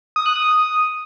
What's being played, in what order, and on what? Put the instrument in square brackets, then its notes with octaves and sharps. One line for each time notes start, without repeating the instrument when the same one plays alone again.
[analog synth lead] D#6
F#6
D#6